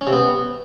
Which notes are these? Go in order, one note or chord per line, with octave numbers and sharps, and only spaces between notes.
C#4
C3
B3